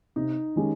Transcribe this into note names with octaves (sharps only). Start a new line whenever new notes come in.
C3 D#4
D#3 G#3 C#4 G4